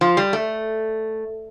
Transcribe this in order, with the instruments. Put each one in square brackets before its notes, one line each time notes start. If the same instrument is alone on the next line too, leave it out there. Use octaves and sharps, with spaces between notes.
[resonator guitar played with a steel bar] F3
G3
A3